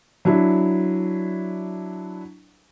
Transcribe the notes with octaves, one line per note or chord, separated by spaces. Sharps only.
F#3 D4 E4